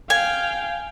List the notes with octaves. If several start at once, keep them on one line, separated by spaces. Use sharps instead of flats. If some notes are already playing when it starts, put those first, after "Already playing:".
F5 G5 G#5